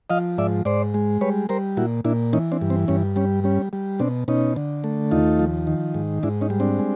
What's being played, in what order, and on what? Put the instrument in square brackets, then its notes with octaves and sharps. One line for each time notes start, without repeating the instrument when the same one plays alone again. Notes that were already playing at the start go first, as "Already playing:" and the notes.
[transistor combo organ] F3 D#5 F5
G#2 D5 E5
G#2 C5 D5
G#3
G3 B4 C#5
G3 A#4 C5
A#2 E4 F#4
A#2 D4 E4
E3 C#4 D#4
C4 D4
G2
C4
G2 C#4
G3 C#4
G3 C#4
G3
B2 C4 D4
B2 C#4 D#4
D3
A3
D#2 D#4 F4
F3
D#3
G#2
G#2 D4 E4
C#4 D#4
G3
C4 D4
G#3